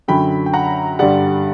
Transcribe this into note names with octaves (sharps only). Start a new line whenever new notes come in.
F#2 D3 F#3 G5 B5
G5
F#5 A#5
G2 D3 G3 D5 F#5